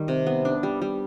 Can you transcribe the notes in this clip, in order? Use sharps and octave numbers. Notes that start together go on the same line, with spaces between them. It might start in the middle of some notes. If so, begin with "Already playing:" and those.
Already playing: D#3 G3
C3
B3
D4
G3
G3